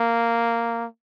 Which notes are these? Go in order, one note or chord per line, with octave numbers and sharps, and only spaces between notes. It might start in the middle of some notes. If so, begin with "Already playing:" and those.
Already playing: A#3